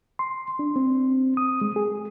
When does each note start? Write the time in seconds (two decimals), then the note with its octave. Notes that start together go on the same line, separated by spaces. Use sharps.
0.19 C6
0.59 D4
0.76 C4
1.37 D#6
1.61 G#3
1.76 G#4